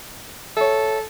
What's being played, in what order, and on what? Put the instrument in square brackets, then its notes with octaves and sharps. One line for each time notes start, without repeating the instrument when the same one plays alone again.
[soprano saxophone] A4 [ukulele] C#5 E5